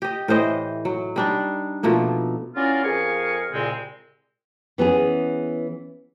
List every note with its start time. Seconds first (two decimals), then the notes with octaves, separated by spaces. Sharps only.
0.02 G4 D#5
0.28 A2 E3 C5 D#5
0.85 F#3
1.16 G3 D4 D#4
1.83 B2 F3 A3 A#3
2.55 F#3 C#4 E4 F4 A#4 D5
2.82 F2 G#4 A#4 F5 G#5 C#6
3.52 C2 A#2 C#3 G#3 C4
4.78 E3 B3 C#4 G#4